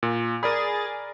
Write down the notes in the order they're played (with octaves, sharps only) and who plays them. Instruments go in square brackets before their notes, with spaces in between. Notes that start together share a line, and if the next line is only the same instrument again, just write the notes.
[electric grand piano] A#2
[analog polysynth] G#4 A6 [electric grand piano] A#4 D5 B5